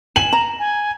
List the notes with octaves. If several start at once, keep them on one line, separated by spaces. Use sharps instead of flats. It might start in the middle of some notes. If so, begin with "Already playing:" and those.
G#5 E7 F#7
A#5
G#5